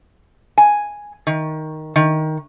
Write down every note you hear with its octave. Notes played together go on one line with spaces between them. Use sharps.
G#5
D#3
D#3